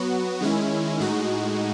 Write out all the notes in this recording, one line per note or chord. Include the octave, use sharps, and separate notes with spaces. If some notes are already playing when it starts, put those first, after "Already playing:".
Already playing: F#3 B3 F#4
D#3 G#3 C#4 E4
A2 G#3 D#4 F#4